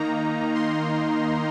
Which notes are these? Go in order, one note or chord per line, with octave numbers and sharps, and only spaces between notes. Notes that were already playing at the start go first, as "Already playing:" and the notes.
Already playing: D#3 A#3 D#4 A#5
C6